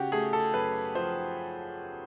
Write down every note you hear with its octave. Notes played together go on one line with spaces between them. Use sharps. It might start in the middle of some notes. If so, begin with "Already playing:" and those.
Already playing: C#3 F#4 G4
A3 G#4
A4
F#2 B4
F3 C5